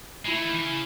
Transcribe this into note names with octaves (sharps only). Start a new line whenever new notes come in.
G#3 E4
A3
D#3
E3
C#3